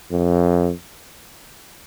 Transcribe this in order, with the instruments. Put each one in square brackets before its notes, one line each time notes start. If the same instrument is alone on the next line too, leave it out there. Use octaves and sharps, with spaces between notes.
[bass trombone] F2